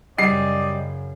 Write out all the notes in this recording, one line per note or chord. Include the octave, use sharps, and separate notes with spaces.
F#2 C#3 G3 G#4 D5 D#5 C7